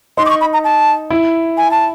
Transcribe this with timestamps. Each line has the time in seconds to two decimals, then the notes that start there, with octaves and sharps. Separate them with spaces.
0.17 D#4 C6
0.26 D6
0.30 C#6
0.41 B5
0.53 A#5
0.64 A5
1.10 E4
1.57 G#5
1.71 A5